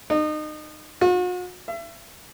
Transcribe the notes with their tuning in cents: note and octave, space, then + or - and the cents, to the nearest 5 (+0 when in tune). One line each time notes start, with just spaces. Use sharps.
D#4 -30
F#4 -45
E5 +35